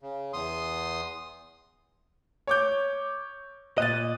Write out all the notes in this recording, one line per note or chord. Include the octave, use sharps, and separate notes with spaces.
C#3
E2 C6 D#6
C#5 D6 G6
A#2 D#5 F#6 A6